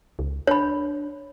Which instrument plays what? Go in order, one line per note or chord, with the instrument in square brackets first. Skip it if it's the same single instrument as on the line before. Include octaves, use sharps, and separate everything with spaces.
[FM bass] C#2
[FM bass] D4 [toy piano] C#5 B5